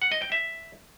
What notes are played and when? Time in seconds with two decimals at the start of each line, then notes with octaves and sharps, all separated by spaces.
0.02 F#5
0.12 D#5
0.22 G5
0.32 E5